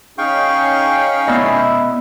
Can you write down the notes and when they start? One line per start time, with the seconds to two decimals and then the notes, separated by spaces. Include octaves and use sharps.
0.18 C#4 D#4 G#4 F5 G5 C#6
1.28 B3 E4 D5 D#5